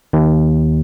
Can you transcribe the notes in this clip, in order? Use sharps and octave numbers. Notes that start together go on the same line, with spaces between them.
D#2